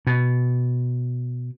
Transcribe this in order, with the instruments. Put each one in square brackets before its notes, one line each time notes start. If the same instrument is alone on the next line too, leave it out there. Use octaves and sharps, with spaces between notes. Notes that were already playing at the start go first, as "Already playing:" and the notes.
[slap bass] B2